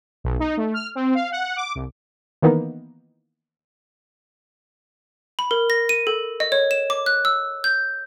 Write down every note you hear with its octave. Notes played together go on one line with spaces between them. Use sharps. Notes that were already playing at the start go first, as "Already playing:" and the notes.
B1
D#4
A3
F6
C4
F5
F#5
D6
C2
D#3 E3 A#3 B3 D#4
B5
A#4
A#6
D#7
A4
D#5
C#5
E7
D6
F#6
E6
G6